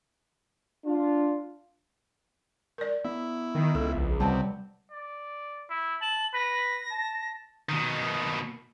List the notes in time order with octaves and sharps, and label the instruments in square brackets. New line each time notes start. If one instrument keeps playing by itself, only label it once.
[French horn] D4 [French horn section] F4
[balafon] A#4 D5
[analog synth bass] B3 [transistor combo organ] E4
[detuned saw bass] D#3
[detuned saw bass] C#2 [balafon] A4
[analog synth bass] A#1
[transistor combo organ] C3 [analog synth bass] G3 [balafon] F#5 A5
[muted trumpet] D5
E4
[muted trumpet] A5 [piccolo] F#7
[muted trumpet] B4 [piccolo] A#6
[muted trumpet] A5
[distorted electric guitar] B2 D#3